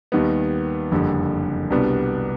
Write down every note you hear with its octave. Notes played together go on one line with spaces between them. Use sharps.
D#2 D#3 G3 B3
F#1 F2 D3 G3
C2 B2 G3 B3 D4